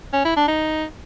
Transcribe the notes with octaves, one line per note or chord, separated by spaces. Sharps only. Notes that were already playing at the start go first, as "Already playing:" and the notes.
C#4
E4
D4
D#4